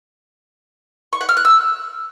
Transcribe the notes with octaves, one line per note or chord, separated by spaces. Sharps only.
C#6
F#5
F6
F#6
E6